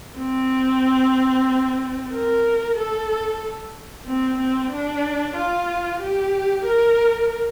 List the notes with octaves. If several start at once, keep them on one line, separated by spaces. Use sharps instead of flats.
C4
A#4
A4
C4
C4
D4
F4
G4
A#4